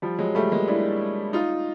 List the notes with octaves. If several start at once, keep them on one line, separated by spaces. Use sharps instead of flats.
F3 G3
F#3 G#3
G3 A3
G#3 A#3
D4 E4
D#4 F4